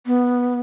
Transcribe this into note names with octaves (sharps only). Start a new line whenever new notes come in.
B3